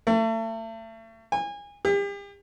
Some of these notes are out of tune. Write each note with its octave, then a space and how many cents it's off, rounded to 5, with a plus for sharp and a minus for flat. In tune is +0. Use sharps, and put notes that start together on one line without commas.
A3 +35
G#5 -30
G4 +40